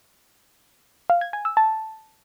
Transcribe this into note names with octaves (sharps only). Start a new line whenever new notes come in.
F5
G#6
G#5
E6
A5